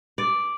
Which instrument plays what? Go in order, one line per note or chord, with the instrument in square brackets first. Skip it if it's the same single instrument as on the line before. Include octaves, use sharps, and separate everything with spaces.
[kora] D5